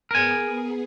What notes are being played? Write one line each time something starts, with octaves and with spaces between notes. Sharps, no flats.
B3 G#4 A#4 G#5